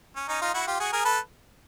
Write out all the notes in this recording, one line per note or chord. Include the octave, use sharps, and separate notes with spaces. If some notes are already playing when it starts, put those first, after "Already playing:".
C#4
C#4 D#4
D#4 F4
E4 F#4
F4 G4
F#4 G#4
G#4 A#4
A4 B4